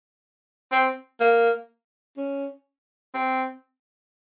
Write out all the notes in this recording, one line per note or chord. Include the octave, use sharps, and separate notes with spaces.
C4
A#3
C#4
C4